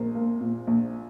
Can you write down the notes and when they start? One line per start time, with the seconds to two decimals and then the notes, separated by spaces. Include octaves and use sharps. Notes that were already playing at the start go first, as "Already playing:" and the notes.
Already playing: A#1 A#4 C5
0.15 A#3
0.41 A#2
0.67 A#1